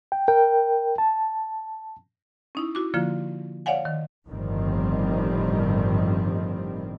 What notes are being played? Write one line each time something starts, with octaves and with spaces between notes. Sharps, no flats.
G5
A#4 G5
A5
C#4 D#4 E4
E4 F#4 D6
D3 F3 A#3 F4
C#5 D5 F5 F#5 G#5
D#3
G1 A2 D#3 F3 G3 C4